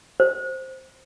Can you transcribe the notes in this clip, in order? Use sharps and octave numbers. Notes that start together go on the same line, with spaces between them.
C5